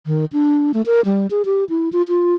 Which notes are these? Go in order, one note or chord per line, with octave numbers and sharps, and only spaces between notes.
D#3
D4
A3
A#4
G3
G#4
G4
E4
F4
F4